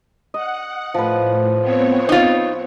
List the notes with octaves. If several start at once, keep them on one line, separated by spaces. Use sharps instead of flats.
D#5 F#5
A2 F3 B4
B3 C4 C#5
D#4 F4